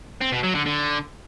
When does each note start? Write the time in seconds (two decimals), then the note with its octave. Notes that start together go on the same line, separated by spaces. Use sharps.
0.21 C4
0.32 B2
0.43 F#3
0.55 D3
0.66 D3